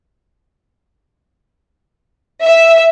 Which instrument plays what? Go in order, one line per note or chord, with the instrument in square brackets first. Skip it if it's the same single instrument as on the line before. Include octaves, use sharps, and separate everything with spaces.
[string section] E5